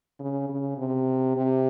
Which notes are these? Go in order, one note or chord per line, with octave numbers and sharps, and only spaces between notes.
C#3
C#3
C3
C3